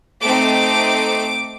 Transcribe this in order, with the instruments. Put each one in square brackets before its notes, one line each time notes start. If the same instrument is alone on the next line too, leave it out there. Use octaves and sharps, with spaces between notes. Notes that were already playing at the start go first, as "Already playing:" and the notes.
[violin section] A3 C4 D#4 D6